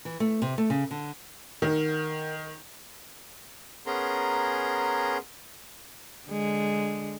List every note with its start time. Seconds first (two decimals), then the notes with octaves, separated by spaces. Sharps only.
0.05 E3
0.20 A3
0.42 C3
0.58 A3
0.70 C#3
0.91 D3
1.62 D#3 A#4 F#5
3.86 B3 C#4 G#4 A#4 A#5 C6
6.28 D3 G#3